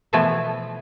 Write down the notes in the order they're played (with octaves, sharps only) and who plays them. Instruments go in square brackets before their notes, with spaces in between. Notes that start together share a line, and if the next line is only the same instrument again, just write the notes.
[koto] B2 E3 F3 A3 B3 G#5